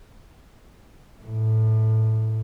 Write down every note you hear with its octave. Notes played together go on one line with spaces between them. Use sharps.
A2